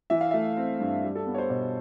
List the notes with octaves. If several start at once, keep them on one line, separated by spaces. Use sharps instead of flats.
E3 E5
F5
A3 E5
C4
G2
G3
A4
B3
C#5
C5
B2 C#5